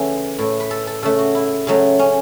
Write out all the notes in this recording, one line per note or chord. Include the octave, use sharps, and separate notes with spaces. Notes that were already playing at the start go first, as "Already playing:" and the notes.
Already playing: C#3 E3 A3 F#4 A4
A2 A3
B4
A4
A4
C#3 A3 A4
F#4
E4
C#3 F#3 A3
C#4